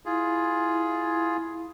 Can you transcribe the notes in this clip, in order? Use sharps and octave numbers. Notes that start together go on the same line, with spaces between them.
E4 F4 G#4